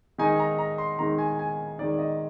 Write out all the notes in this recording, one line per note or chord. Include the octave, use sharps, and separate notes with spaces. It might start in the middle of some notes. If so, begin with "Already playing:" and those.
D#3 G#3 D#4 G#5
A#5
A#5
C6
D#3 G#3 D#4 A#5
G#5
G#5
D#3 G#3 D#4 D5
D#5